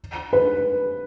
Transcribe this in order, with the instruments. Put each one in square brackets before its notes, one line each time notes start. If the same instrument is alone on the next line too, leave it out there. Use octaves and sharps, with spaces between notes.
[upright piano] B4